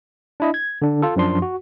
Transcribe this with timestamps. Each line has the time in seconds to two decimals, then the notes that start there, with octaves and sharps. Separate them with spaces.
0.40 D4 E4 D#5
0.54 G#6
0.82 D3 D4
1.02 F4 A4
1.16 F#2 F3 D4 C6
1.42 F#4